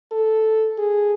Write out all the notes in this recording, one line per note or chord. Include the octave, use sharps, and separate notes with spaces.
A4
G#4